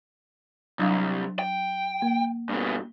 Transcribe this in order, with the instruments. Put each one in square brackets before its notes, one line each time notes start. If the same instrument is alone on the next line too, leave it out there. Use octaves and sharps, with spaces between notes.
[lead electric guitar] C2 [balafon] F#3 D4 F5
[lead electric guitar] G5
[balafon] A#3
[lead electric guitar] G2 B2